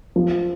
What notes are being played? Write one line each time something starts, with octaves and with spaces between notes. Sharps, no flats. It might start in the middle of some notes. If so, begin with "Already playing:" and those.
F3